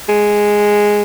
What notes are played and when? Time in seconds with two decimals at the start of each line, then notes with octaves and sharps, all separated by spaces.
0.09 G#3